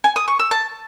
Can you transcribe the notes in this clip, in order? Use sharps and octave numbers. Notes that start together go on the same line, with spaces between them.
G#5
D#6
C#6
E6
A5